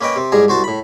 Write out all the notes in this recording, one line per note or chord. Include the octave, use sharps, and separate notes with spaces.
A#3 C#4 B4 D#5 G5
C3 C4
A1 G#2 G3 G#4 A#5
C2 F#4 C5 A5
A2 B5